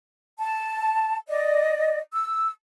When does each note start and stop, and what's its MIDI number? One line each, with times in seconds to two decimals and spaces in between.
0.39 1.17 81
1.28 1.98 74
1.28 1.98 75
2.13 2.50 88